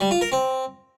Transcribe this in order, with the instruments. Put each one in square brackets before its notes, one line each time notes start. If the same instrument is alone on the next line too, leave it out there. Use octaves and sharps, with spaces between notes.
[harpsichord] G3
F4
A#4
C4